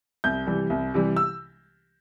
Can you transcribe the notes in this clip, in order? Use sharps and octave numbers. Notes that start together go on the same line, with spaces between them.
C2 G6
C3 E3 G3
C2
C3 E3 G3
E6